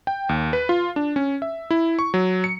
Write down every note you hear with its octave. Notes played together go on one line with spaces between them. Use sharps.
G5
D#2
B4
F4
D4
C#4
E5
E4
C#6
F#3
C#7